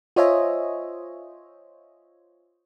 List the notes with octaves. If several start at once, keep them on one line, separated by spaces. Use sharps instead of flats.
F4 C5 C#5 D#5 E5 G#5